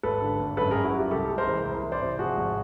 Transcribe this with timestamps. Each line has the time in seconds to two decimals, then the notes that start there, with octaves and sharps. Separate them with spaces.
0.03 G#1 A4 B4
0.22 D3
0.39 G#1
0.57 F#2 A4 B4
0.71 F#2 G#4 A#4
0.84 E4 F#4
0.93 G3 F4 G4
1.11 C2 G4 A4
1.30 G#3
1.38 A#4 C5
1.47 E3
1.65 C2
1.83 E3
1.92 C5 D5
2.01 C3
2.19 F3 F#4 G#4
2.37 G#1